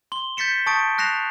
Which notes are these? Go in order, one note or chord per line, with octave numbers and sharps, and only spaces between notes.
C6 G7
G6 A6 B6 C#7 E7
A5 C#6 D#6 G6 A6 D7
F#6 A#6 C7 E7 F7